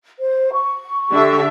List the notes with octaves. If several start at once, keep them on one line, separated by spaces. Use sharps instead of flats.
C5
C#6
D3 G4 E5